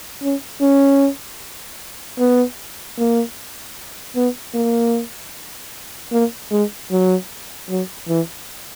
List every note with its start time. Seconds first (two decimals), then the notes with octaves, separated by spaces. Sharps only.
0.22 C#4
0.61 C#4
2.19 B3
2.98 A#3
4.16 B3
4.54 A#3
6.12 A#3
6.51 G#3
6.91 F#3
7.69 F#3
8.08 E3